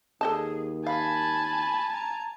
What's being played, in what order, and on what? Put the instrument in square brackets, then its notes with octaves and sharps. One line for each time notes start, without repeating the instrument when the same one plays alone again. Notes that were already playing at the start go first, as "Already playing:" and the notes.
[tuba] D#2 [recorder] G#4 [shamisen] A4 D#5 A5
[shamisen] F5 [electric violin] G#5 A5 [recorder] B5
[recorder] A#5